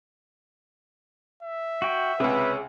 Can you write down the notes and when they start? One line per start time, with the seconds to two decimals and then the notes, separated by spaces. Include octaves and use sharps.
1.43 E5
1.82 F#4 G5
2.20 C#2 C3 G#4 B4 C#5 E6